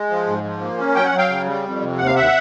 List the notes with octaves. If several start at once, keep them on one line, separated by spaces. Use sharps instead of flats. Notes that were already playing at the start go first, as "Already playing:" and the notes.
Already playing: G#3
F3
G#2
F3
A#3
C#4
F#3 G5
F#5
F#3
F5 G5
C#3
G3
F2
C3
D#2 F#5
F5
D#2 E5 F#5